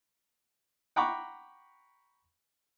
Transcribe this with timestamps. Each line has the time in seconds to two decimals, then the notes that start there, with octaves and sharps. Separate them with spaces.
0.96 F#5 G5 A#5 B5 C#6 D6